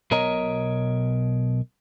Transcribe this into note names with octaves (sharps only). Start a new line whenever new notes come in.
B1 B2 A#4 C#5 D#5 A#5